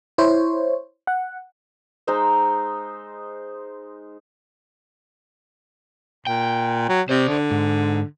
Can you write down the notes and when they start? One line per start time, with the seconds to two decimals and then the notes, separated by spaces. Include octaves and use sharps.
0.18 E4 C5 C#5
1.07 F#5
2.07 G#3 D#4 C5 E6
6.27 A#2 G5
6.89 F#3
7.09 C3 C5 D5
7.28 D3
7.51 G#2